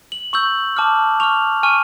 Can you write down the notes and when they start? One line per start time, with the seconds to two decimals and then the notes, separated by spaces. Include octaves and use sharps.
0.12 F#7
0.33 C#6 E6 G6 F#7
0.77 A5 D6 F6
1.20 C#6 F6 F7
1.63 G#5 C#6 F6 D#7